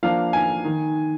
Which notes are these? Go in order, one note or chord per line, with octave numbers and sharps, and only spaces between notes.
F3 A#3 D4 F5
G#5
D#3